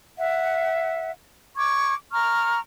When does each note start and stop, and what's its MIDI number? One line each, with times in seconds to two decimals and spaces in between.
0.18 1.11 76
0.18 1.11 78
1.57 1.95 85
1.57 1.95 86
1.57 1.95 92
2.12 2.60 82
2.12 2.60 85
2.12 2.60 89